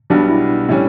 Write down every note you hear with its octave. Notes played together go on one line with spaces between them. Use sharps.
B1 B2 G3 B3 D4
E4
A2 G3 C#4